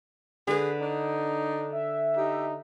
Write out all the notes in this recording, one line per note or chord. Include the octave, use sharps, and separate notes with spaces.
D3 G#4 B4
D4 D#4
E5
D#4 G4